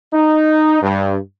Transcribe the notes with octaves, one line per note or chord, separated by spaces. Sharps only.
D#4
G2